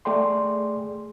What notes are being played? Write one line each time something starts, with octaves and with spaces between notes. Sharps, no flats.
A3 G#4 D5 G5 C6